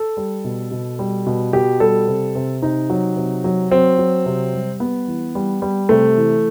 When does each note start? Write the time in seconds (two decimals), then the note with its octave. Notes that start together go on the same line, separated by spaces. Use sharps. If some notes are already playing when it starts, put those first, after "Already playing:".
Already playing: A4
0.17 G3
0.44 B2
0.71 B2
0.99 G3
1.26 B2
1.53 B2 G4
1.80 G3 A4
2.08 C3
2.35 C3
2.62 C3 D#4
2.90 F#3
3.16 C3
3.44 F#3
3.71 F#3 C4
3.98 F#3
4.26 C3
4.54 G3
4.80 G3 B3
5.08 E3
5.35 G3
5.62 G3
5.89 C3 A3
6.17 E3